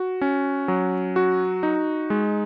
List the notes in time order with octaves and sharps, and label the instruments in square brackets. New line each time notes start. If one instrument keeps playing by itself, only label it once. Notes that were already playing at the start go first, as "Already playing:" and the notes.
Already playing: [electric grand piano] F#4
C#4
F#3
F#4
D#4
G#3